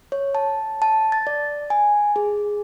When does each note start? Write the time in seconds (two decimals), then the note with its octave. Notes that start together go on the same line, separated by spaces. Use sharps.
0.12 C#5
0.35 A5
0.82 A5
1.12 A6
1.27 D5
1.70 G#5
2.16 G#4